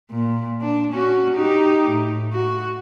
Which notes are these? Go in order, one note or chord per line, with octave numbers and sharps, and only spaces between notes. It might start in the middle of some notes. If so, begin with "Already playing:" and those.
A#2
D4
C#4 F#4
D#4 G4
A2
F#4